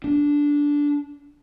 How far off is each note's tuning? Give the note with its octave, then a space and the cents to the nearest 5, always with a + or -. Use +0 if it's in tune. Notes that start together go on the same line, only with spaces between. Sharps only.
D4 -10